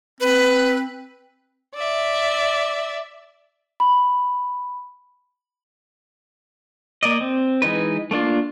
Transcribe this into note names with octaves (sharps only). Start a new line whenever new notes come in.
C4 B4
D5 E5
B5
A#3 D5 D#5
C4
E3 G#3 D#4 B4
A3 A#3 D4 F4